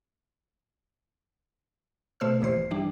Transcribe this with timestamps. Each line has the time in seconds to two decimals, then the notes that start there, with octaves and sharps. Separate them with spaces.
2.20 B2 A3 C5 E6 F6
2.41 A#1 G2 E3 C5 C7
2.71 E3 G3 D4